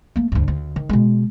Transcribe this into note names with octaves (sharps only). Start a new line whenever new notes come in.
A3 A#3
D2 G2
D2
D#3
B2 G#3